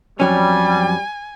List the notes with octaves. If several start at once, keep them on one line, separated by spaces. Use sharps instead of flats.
F2 F#3 G3 C#4 G#5